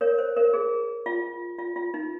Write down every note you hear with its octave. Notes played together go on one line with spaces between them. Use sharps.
A#4 C#5
C5
A#4
G#4
F4
F4
F4
D#4